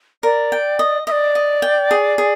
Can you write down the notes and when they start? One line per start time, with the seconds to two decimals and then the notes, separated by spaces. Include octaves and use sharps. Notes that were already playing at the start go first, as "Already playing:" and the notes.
0.23 A#4 D5
0.52 G5
0.79 D#5
1.07 D#5 E5
1.11 D5
1.35 D#5
1.62 G5
1.91 G#4
2.18 G#4